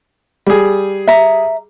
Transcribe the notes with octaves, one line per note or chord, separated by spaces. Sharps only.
G3 G#4
E5 A#5